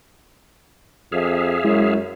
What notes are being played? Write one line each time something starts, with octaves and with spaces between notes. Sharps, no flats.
F2 G#4 E5 F5
F#2 G#3 E4